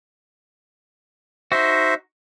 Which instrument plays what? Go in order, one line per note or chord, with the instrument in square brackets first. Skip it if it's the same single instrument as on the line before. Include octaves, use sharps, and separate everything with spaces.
[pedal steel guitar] D#4 F#4 [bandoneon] C5 E5